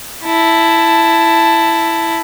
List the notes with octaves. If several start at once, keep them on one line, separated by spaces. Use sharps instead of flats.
E4 A5